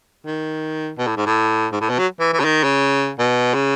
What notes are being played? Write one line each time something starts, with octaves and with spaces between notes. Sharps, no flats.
D#3
B2
A2
G#2
A2
G#2
A2
B2
F#3
E3
E3
C#3
D#3
C#3
B2
C#3